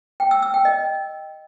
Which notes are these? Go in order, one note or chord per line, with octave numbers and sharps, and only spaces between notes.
G5
E6
E6
G5
D#5